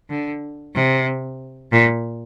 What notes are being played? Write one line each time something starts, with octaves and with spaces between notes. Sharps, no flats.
D3
C3
A#2